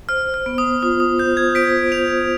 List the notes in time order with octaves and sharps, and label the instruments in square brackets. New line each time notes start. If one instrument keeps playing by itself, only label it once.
[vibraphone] C5 [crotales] F6
[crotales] F6
[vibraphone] B3
[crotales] D#6
[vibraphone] F4 [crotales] D#6
[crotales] D#6
[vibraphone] C5 [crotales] G6
[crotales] G#6
[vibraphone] C5 [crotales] B6 D7
[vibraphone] C5 [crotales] D7 F7